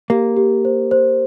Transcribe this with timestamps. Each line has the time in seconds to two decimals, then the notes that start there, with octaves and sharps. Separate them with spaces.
0.10 A#3 G4
0.37 G4
0.65 C5
0.91 C5